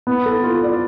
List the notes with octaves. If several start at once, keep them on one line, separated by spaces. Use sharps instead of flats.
B3
A4
F4
D5